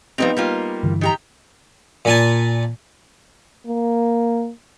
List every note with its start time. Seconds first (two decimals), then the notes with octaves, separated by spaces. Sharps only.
0.18 F3 G3 B3 C4 D#4 F7
0.37 G3 A#3 F4
0.83 G2 D3 E3
1.01 D#3 G4 A#5
2.05 A#2 G#5 A5
3.66 A#3